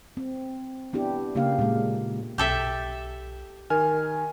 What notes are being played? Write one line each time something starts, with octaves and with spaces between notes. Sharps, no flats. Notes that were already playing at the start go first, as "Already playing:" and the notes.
C4
B3 D4 E4 G4
C#3 A#3 D4 G4 F5
A#2 G#3
B1 G4 A4 E5
D#3 A#4 G#5 F6